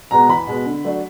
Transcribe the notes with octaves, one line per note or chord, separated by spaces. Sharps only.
B2 G#3 B3 A#5
E2 B5
B2 G#3 B3
D3
F#3 A3 D4